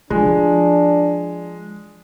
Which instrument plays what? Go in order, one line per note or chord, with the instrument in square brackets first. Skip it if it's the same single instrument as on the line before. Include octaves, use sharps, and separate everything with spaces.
[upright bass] F3 [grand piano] G#3 [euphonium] D4